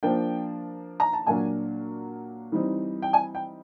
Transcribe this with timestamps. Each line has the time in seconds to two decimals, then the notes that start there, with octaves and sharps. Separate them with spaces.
0.03 F3 A#3 D4 G5
1.00 A#5
1.13 A5
1.27 A#2 F#3 A#3 D4 G#5
2.52 E3 G3 C4 D#4
3.02 G5
3.13 G#5
3.35 G5